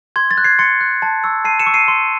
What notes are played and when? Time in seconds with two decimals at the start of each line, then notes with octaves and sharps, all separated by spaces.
0.16 C6 G#6
0.31 A6
0.38 F#6
0.44 G#6 C7
0.59 C6 A6 C#7
0.81 F#6
1.02 A5
1.24 C#6 E6
1.45 A5 C7 D#7
1.59 C#7 E7
1.67 C#6 E6
1.74 C7 D#7
1.88 C6